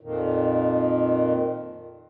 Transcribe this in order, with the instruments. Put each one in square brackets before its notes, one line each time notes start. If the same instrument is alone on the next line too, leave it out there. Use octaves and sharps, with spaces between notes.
[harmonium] F2 A#2 D#3